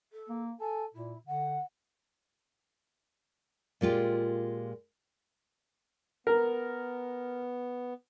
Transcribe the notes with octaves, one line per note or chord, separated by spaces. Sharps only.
A4
A#3
A4 G#5
A#2 E4
D3 F#5
A#2 G#3 F4 G4
B3 A#4